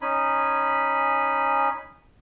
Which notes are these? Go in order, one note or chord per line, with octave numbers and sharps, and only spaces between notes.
C#4 D#4 G#5 B5